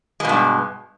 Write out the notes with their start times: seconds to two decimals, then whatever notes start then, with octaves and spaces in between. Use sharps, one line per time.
0.20 G#3
0.25 B2
0.29 G2